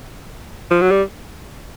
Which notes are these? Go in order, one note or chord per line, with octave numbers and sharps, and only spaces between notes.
F3
F#3
G3